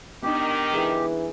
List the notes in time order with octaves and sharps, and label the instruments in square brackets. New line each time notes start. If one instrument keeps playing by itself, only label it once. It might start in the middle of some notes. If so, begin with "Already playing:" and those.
[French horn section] D#3 [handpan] B3 D4 D#4 [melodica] G4
[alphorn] E3 [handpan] G#4